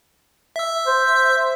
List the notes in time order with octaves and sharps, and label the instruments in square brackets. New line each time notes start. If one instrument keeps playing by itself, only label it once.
[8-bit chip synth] E5 E6
[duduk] C5